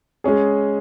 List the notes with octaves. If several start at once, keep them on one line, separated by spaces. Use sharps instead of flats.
G#3 C#4 G#4